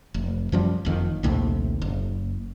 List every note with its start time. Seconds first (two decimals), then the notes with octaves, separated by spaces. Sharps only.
0.14 F1
0.52 F#2 F3 G3
0.85 F#1 F2 D#3
1.23 A#1 D#2 A2 C3
1.82 F#1